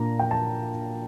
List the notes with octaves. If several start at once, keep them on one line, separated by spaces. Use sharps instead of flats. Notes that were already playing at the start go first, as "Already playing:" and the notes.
Already playing: A#2 A#3 D4 A#5
G5
A5